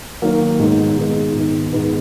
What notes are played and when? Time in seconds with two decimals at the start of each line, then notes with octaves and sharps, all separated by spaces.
0.22 D#3 F#3 A#3
0.59 G#2 D#3 G#3 B3 D#4
0.97 G#2 D#3 G#3 B3 D#4
1.34 G#2 D#3 G#3 B3 D#4
1.72 G#2 D#3 G#3 B3 D#4